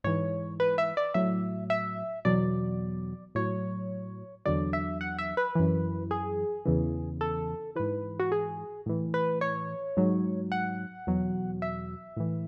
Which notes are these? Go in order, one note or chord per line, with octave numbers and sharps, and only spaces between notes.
G#2 E3 C#5
B4
E5
D5
A2 F#3 E5
E5
E2 B2 F#3 D5
A2 F#3 C#5
E2 D3 F#3 D5
E5
F#5
E5
B4
F#2 E3
G#4
E2 C#3 E3
A4
G#2 E3 B4
F#4
G#4
A2 E3
B4
C#5
G#2 F#3
F#5
E2 B2 F#3
E5
A2 E3